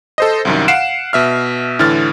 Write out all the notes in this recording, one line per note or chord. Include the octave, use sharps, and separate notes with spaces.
A4 C5 D#5
C2 F#2 D#3
F5 F#5 C7 D7 E7
B2 E5 F6
A2 D3 E3 F6 A6